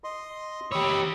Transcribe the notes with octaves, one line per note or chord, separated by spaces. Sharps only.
D#5 C6
G4 C#5 B5 D#6 E6